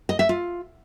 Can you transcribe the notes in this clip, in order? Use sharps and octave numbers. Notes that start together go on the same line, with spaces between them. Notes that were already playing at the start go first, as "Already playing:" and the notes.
D#5
E5
F4